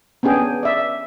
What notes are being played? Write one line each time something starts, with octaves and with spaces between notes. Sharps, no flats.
B3 C#4 D4 G#4 G5
D5 E5